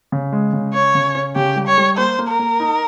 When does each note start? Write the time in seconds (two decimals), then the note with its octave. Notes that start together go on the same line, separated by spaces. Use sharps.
0.12 C#3
0.32 G#3
0.53 C#3
0.74 C#4 C#5
0.95 C#3
1.15 C#4
1.36 C#3 G4
1.56 G3
1.67 C#5
1.78 G3
1.97 A#3 C5
2.19 A#3
2.28 A#4
2.39 A#3
2.60 D#4